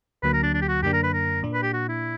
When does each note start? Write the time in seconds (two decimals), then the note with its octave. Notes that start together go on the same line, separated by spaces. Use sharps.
0.23 D2 D3 F#3 A#3 B4
0.33 A#4
0.43 D4
0.54 D4
0.61 G4
0.68 F#4
0.82 F#2 D3 A#3 D4 G4
0.93 A#4
1.03 B4
1.13 A#4
1.43 A#2 A#3 D4
1.54 B4
1.63 G4
1.73 F#4
1.88 E4